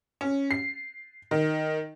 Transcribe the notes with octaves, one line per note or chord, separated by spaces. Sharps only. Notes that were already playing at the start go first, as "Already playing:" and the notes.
C#4
C7
D#3